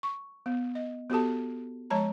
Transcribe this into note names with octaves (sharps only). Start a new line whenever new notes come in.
C#6
B3
D#5
B3 F#4 G4 A4 A5
F3 G#3 C#5 A5 A#5